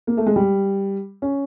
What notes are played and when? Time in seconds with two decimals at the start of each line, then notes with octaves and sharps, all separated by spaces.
0.07 A#3
0.17 A3
0.26 G#3
0.36 G3
1.22 C#4